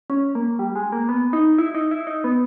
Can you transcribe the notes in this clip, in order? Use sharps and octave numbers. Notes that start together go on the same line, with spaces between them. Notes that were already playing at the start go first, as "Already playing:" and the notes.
C#4
A#3
G3
G#3
A#3
B3
D#4
E4
D#4
E4
D#4
B3